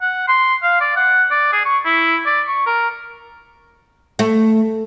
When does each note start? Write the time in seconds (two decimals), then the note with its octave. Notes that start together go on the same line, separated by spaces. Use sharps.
0.02 F#5
0.28 C6
0.63 F5
0.81 D5
0.96 F#5
1.31 D5
1.53 G#4
1.65 C#6
1.85 E4
2.26 D5
2.48 C#6
2.66 A#4
4.19 A3